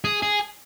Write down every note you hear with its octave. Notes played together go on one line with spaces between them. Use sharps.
G#4
G#4